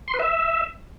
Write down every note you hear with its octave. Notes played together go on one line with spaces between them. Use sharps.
C6
B4
E5